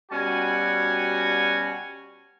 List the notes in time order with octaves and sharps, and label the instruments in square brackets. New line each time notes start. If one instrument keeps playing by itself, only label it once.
[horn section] B2 G3 C#4 F#4 G#5